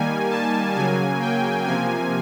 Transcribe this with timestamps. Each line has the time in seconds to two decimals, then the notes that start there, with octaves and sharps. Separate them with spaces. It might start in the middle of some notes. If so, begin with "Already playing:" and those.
Already playing: D#3 G3 A#3 G#5
0.30 A5
0.75 C#3 F#3 A#3 G#5
1.20 G5
1.66 C3 F3 A#3 G#5